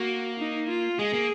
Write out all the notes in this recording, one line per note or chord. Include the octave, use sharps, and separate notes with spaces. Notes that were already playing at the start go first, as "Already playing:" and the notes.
Already playing: A#3 F#4
D#4
F4
G#3 G#4
A#3